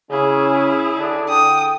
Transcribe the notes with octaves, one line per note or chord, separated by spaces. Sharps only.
C#3 C#4 E4 G#4
D3 D4
G5 D#6